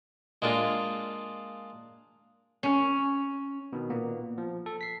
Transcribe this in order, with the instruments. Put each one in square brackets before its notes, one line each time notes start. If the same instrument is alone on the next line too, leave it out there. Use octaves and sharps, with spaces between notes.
[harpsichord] G#3 A#3 D4 F4
[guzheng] C#4
[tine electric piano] B2 D#3
A#2 A#3 B3
F3
A4
B6 C7